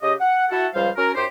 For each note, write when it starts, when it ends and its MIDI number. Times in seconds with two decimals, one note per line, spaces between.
0.03 0.13 49
0.03 0.13 67
0.03 0.13 75
0.20 0.46 78
0.51 0.67 64
0.51 0.67 66
0.51 0.67 69
0.51 0.67 78
0.74 0.90 37
0.74 0.90 53
0.74 0.90 55
0.74 0.90 72
0.74 0.90 77
0.97 1.12 61
0.97 1.12 66
0.97 1.12 70
1.15 1.25 42
1.15 1.25 63
1.15 1.25 67
1.15 1.25 72